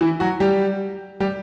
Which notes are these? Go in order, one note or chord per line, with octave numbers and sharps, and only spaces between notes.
E3 E4
F#3 F#4
G3 G4
G3 G4